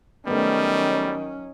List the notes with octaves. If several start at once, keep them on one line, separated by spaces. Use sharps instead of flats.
D#3 F#3 G3 A3 B3 C#4